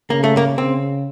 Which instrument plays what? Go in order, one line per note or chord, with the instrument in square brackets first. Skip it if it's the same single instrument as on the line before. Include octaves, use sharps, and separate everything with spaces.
[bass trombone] C#3 [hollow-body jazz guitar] A#3
[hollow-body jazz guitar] A3
A#3
[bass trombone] C#3 [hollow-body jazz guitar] C4